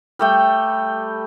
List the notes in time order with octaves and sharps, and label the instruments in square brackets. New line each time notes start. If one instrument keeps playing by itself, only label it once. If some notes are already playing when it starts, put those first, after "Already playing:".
[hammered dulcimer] G3 A3 G5